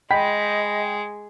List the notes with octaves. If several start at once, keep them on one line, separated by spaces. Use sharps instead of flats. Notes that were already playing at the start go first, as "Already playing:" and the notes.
G#3 D#5 G5 B5 B6